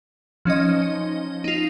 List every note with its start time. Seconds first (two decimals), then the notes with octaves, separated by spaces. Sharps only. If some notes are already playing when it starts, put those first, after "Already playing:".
0.45 F3 C#4 D#4 D#5
1.44 D#4 F4